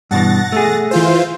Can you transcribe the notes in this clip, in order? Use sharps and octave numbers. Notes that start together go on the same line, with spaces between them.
G2 B2 E3 F#5 A6 A#6
A3 G#4
E3 F4 C5